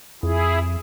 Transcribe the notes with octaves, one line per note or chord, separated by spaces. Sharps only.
F2 E4 G#4